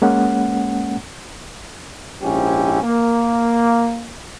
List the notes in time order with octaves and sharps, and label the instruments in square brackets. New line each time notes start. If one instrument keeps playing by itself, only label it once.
[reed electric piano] G#3 A#3 C#4 F#5
[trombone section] A#1 G#2 C#4 E4 G4
A#3